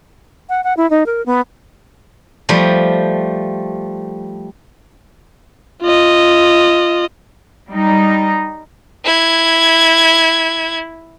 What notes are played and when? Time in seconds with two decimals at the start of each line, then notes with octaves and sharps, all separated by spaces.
0.49 F#5
0.64 F#5
0.77 E4
0.90 D#4
1.06 A#4
1.26 B3
2.49 F3 G3 A3
5.82 F4 D#5
7.69 G3 D#4
9.05 E4 G#6